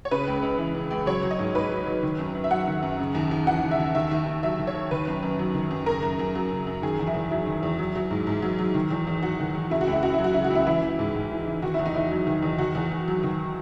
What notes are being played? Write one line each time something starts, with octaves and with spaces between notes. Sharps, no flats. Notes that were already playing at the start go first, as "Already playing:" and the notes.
C#5
C#3 B4
C#2
C#2
E3
C#3
C#2
F#3 C#5
F#3
D#5
G#2
G#2 B4
F#3
F#3
D#3
F#2
F#2
E5
F#3 F#5
D#3
F#2
C#3
D#2
D#2
E3 F#5
C#3
E5
D#2
D#3 E5
D#2
D#2
F#3 E5
D#3
C#5
D#2
D#3 B4
F#2
F#2
F#3
D#3
F#2
C#3 A#4
F#2
F#2
F#3
C#3
F#2
D#3 G#4
E2
E4
E2
F#3 E4
D#3
E2
F#3
F#3
G#2
G#2
F#3
F#3
D#3
E2
E2
F#3 F#4
D#3
E2
C#3 E4
F#4
C#2
E4
C#2 F#4
E4
F#3
F#4
C#3 E4
F#4
C#2 E4
E3 E4
E3
G#2
G#2
E3
E3
D#3 F#4
E4
E2
D#4
E2 E4
F#3
D#3
E2
D#3 F#4
E2
E2
F#3
D#3